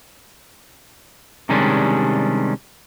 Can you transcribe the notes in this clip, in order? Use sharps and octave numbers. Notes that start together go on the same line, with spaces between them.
C3 D#3 G3 G#3 C#4 D4